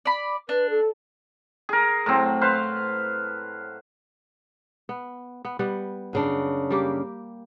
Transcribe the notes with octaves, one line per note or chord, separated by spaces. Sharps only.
D5 B5
D4 B4
A4
G#4 A#4
A2 F#3 C4
B4 C5 F5
B3
B3
G3 B3 F#5
F#2 C#3 D4
G3 A#3 G4